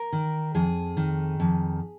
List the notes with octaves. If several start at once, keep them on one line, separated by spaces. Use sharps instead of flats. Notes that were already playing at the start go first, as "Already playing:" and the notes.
Already playing: A#4
D#3
F2 G#4
D#3
F2